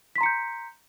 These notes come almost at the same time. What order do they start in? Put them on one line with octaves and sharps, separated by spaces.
B6 C6 A#5 C#7 G6